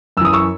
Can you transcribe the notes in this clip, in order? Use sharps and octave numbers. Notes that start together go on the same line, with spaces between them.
F#2 E3 D#6 E6
C#6 E6